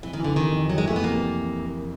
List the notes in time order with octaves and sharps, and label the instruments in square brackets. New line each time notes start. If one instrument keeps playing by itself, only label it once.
[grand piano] F2 [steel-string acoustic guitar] E3
[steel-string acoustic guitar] D#3
[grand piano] E3
[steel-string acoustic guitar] D3
[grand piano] C3 [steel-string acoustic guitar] D#3
[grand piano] F2
[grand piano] F2 [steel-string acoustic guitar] F#3
[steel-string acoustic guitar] G#3
[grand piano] E3 [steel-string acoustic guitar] A3
[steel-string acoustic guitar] B3
[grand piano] C3 [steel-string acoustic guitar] A#3